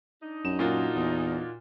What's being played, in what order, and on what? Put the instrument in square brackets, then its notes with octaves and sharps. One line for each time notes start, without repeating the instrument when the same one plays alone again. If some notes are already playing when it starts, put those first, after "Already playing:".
[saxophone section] D4 D#4
[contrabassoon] F#2 [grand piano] E7
[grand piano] A#2 F4 F#4
[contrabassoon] E2